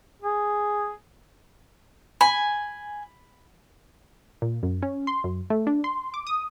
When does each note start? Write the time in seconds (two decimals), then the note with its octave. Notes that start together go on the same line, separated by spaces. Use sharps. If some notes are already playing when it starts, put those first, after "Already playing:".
0.22 G#4
2.21 G#5 B5
4.42 A#2
4.63 F#2
4.82 C#4
5.07 C6
5.24 F#2
5.50 A3
5.67 D4
5.84 C6
6.14 D6
6.27 D#6